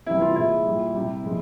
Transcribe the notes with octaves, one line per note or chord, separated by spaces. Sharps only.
C3 E3 G3 E4
F4
A#2 G#3 E4
A#2 G3
C3 G3
A#2 F3 G#3